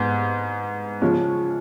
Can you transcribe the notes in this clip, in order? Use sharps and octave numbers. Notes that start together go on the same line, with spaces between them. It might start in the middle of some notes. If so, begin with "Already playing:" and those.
Already playing: G#2 B3
C#3 F3 G#3 C#4